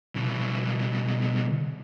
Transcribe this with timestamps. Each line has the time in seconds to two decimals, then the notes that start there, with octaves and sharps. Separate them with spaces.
0.16 C2 B2